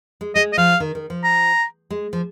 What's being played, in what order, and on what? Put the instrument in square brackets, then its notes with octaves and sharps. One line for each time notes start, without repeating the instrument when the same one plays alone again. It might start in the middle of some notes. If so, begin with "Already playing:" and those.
[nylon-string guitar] G#3
[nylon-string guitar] G#3 [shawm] D#5
[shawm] D#5
[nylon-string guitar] F3 [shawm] F5
[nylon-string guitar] D#3
D#3
F3
[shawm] A#5
[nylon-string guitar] G#3
F3